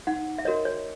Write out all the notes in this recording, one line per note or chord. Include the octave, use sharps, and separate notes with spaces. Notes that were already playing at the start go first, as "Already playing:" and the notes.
D#4 F#5
E5
F#4 A#4 C#5 D#5
C#5